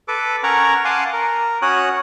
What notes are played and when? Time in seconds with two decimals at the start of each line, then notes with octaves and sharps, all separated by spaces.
0.08 A4 B4 D6
0.43 C#4 A#4 C#5 F#5 A#5 C#6
0.85 F5 F#5 G#5 A5 C6 D6
1.13 A#4
1.62 C#4 F#4 C#5 D#6 F#6